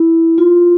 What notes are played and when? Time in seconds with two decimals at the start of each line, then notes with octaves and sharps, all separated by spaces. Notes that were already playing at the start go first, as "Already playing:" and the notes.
Already playing: E4
0.38 F4